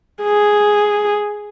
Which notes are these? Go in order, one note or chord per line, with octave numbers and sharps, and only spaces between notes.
G#4